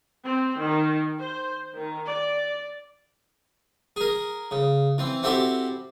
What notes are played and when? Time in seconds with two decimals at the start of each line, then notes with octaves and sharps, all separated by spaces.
0.25 C4
0.64 D#3
1.19 C5
1.73 D#3
2.09 D5
3.96 G#4 A#4
4.51 C#3
4.98 E3 C4
5.23 C4 E4 F#4 G4 A4